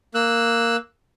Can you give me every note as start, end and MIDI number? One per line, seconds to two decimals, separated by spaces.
0.15 0.76 58
0.15 0.76 88
0.15 0.76 90